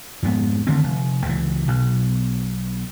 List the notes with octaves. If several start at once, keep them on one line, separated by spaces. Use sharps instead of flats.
F2 G#2 B3
D3 D#3 A3 C4
F1
C#2 E3
B1 B2